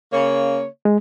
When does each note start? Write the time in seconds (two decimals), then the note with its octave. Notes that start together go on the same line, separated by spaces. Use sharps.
0.13 C#3 A#3 C#5
0.85 G#3